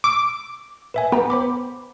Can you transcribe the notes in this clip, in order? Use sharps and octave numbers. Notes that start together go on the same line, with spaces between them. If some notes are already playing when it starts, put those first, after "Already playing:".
C#6 D6 E6
B4 E5 G#5
B3 G5 A#5
C5 B5 D6